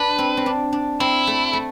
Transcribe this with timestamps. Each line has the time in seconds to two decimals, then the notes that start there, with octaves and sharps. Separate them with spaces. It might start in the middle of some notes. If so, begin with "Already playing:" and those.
Already playing: D4 B4
0.18 C4
0.37 C4
0.46 D4
0.73 D4
1.00 C4 E4
1.27 A3
1.53 A3